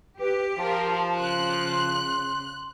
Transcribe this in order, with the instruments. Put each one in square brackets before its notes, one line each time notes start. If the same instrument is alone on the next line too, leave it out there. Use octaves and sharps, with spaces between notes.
[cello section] G4 [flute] B4
[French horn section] F3 [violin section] F4 A#4 [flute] A5
[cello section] C#3 [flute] C6 [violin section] F#6